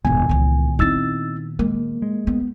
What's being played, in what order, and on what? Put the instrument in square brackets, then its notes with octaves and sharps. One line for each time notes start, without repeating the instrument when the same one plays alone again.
[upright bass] E1 G2 [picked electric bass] A#2 D#3 B3 [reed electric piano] G#5
[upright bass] C#2 E3
[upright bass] C4 E4 [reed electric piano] D#4 E6 A6
[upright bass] G#3 [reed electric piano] A#3
[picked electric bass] G#3
[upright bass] B3